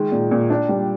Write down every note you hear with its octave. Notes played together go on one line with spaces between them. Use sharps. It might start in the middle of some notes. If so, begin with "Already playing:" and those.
Already playing: D#3 G#3
A#2
A#2
D4
G3